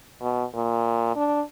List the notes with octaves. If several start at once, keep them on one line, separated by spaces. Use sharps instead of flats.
B2
A#2
D4